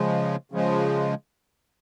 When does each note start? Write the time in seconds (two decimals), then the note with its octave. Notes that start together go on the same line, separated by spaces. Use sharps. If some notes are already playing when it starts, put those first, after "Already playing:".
Already playing: C#3 F3 G#3
0.52 C#3 F3 G#3